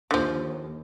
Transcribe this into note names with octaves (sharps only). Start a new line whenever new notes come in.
D#2 D3 F3